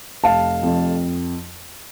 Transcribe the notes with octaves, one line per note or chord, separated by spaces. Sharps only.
F1 F5 A5
F2